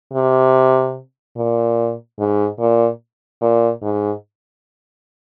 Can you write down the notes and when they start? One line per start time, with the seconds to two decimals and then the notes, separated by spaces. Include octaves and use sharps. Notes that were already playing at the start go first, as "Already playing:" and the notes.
0.13 C3
1.36 A#2
2.19 G#2
2.59 A#2
3.41 A#2
3.82 G#2